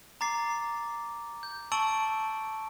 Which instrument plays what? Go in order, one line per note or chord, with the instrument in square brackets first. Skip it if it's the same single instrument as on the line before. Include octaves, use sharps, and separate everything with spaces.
[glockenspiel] A#5 D6 A6 C7
G6
A5 C#6 E6 A6 D7 F#7